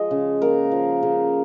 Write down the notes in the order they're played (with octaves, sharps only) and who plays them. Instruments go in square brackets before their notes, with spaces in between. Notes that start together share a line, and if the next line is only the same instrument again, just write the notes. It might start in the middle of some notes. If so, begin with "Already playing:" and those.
Already playing: [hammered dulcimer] F3 G#3 D#5
C#3
A#3 A#4
F3
C#3